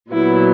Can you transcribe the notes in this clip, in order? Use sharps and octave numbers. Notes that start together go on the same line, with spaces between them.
A#2 F#3 B3 E4